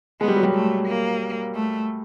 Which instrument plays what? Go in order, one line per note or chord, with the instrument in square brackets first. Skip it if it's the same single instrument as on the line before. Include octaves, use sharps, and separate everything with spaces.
[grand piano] G#3 [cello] B3
[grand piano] G3
F#3
G3
[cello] A3
A#3
A3